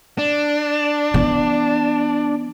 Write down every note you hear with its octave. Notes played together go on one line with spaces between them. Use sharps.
D4
E3 B3